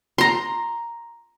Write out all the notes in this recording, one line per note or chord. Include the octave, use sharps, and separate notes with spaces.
A#5 C6